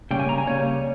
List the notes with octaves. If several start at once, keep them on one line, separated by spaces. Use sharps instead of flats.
C#3 G3 A#3 C#4 G5
G#5
A#5
G#5
C#3 G3 A#3 C#4 C#5